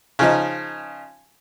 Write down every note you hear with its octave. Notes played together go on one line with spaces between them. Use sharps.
C#3 F3 D#4